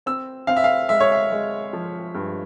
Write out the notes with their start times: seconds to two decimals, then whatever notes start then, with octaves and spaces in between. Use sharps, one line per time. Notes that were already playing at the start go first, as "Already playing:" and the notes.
0.06 C4 E6
0.47 C4 F5
0.56 E5
0.64 F5
0.89 G#3 E5
1.00 C#5
1.12 E5
1.31 G#3
1.73 F3
2.15 G2